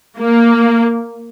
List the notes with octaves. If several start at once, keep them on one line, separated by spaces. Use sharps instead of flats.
A#3